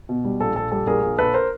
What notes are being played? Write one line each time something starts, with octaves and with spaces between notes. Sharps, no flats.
B2
G3
A#1 A4
A#1 A4
G3 A4
A#1 G#4 A#4
A#1
A#1 A4 B4
A#4 C5